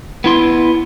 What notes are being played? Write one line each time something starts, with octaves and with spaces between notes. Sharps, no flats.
B3 E4 C6